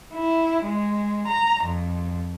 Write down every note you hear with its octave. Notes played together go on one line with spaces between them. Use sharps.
E4
G#3
A#5
F2